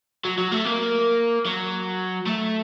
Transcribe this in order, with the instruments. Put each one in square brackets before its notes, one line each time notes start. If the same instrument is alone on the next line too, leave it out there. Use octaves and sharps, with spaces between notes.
[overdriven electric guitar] F#3
F#3
A3
A#3
F#3
A3